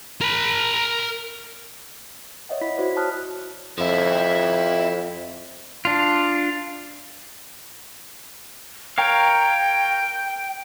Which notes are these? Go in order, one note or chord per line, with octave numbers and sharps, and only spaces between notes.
A#4 B5
C#5 D#5 E5 F#5
E4 B5 B6
E4 F#4 C5 D5
C5 C#5 A5 D#6 F6 F#6
F2 F3 E4
D4 F4
A#4 C#5 F5 G5